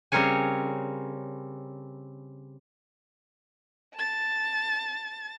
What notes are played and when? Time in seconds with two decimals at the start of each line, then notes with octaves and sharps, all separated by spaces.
0.12 C#3 G3 C4 A#4 C#5 G#5
3.95 A5 A6